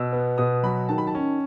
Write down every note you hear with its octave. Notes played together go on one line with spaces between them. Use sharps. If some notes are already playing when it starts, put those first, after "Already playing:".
Already playing: B2 E6
B3
B2 D#6
F#3 B5
D#3 A5
B5
A5
C#4